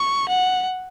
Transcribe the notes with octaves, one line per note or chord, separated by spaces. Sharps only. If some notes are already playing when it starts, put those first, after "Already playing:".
Already playing: C#6
F#5